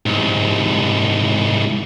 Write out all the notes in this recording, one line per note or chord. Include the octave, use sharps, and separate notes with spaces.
C2 G#2